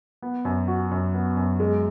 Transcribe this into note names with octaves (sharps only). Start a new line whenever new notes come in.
B3
F#2
F#4
F#2
B3
F#2
G#3